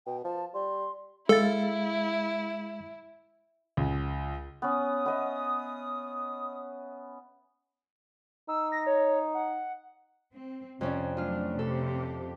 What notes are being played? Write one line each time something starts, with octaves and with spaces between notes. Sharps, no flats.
B2 G5
F3 A5
G3 C6
G#3 E4 A4 F5 A6
C#2
B3 C#4 D#6
B3 D#5 E5
D#4 E6
A#6
C#5
F#5
C4
F2 C3 C#4 D4
F#3 A3 D4 F4 F6
C3 G4 A4